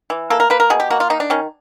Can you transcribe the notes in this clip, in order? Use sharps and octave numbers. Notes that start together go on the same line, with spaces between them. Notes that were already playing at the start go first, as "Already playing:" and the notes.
E3
A#3 A4
A#4
A#3 B4
A#4
B2 G#4
G4
A#3 F#4
F4
D#3 D#4
D4
D#3 C#4